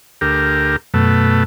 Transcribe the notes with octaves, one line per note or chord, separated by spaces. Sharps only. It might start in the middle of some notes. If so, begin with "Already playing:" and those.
D2 G4 A#4
F#2 B2 A3